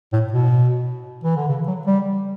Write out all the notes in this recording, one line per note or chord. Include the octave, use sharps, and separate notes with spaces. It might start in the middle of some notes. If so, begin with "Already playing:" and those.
A2
B2
E3
D3
C#3
F#3
G3